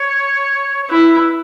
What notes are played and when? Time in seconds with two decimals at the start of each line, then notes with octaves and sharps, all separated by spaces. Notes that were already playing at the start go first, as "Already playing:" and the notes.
Already playing: C#5
0.84 C#5
0.90 E4 B4